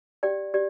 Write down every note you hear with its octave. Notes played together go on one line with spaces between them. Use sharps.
G4 D5 G5
G4 D5